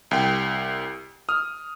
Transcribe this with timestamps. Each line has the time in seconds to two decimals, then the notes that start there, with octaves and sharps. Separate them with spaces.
0.11 C2 G5
1.29 D#6 F6